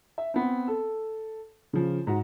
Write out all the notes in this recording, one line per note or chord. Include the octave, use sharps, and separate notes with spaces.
E5
B3 C4
A4
C#3 F3
G#2 F#4